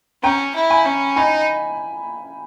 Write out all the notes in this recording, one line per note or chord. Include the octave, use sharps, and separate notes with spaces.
C#4 G5 A#5
E4
G#5 B5
C#4
D#4 G#5 B5